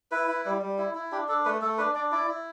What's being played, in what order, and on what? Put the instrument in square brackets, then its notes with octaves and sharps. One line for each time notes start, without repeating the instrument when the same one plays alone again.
[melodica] E4 B4
E4
G3
G3
E4
E4
D4 G4
D4 A4
A3 B4
A3 A4
D4 B4
D4 D5
E4 D5
E4